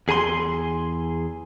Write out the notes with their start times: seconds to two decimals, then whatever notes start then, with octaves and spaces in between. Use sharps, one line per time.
0.08 E2 G#4 G#5 A#5 C6